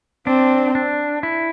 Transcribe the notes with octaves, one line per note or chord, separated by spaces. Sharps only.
C4 D4
D4
E4